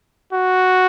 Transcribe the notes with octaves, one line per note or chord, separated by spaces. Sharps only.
F#4